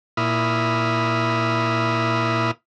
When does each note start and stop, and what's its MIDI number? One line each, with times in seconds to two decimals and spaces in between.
0.17 2.51 46
0.17 2.51 64
0.17 2.51 83
0.17 2.51 87
0.17 2.51 89